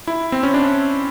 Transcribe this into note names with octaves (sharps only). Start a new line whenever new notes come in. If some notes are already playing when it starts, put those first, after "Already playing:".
E4
C4
C#4
D4